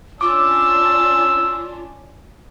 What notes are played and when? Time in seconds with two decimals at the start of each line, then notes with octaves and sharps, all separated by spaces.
0.21 C#4 D4 F4 D6 E6